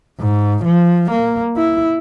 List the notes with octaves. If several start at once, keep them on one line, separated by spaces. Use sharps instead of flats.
G#2
F3
A#3
E4